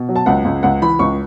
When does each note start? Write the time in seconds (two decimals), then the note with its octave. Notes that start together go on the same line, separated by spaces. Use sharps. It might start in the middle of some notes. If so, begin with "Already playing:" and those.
Already playing: B2
0.09 F#3
0.16 A5
0.26 C#2 F#5
0.45 C#2
0.63 C#2 F#5
0.82 E3 B5
0.99 C#2 C#6